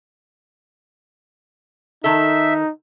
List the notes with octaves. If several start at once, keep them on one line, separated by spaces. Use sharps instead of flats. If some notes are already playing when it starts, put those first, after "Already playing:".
D#3 D#4 A4 E5